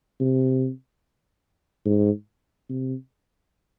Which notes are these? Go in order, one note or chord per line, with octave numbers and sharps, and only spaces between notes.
C3
G#2
C3